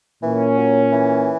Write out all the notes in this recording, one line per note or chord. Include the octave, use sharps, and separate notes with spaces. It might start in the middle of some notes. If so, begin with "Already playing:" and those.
A#2 E3 A#3 C#4
F#3
E3